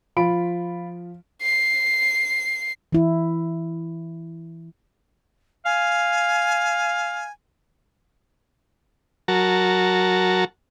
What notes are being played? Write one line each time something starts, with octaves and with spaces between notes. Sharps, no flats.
F3 F4 B5 D7
C7
E3 E4
F5 G#5
F#3 F#4 A#4 A5